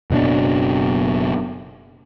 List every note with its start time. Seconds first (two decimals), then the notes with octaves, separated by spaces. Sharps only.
0.10 F#1 B2 F#3 D4